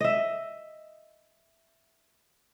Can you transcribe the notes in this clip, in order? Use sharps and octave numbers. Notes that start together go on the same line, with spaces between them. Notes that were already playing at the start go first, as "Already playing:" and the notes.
D#5 E5